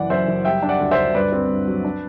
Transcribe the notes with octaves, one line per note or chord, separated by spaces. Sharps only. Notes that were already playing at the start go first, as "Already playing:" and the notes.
Already playing: F#1 E3 D5 F#5
F#2 C5 E5
F#1
G3 E5 G5
D4
D5 F#5
D2
C5 E5
D2
G2 B4 D5
C4
G2
F#3
D4